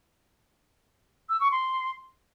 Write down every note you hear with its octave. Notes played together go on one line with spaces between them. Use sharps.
E6
C#6
C6